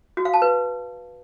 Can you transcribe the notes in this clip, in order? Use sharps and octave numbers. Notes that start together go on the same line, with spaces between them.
F#4
F5
A5
B4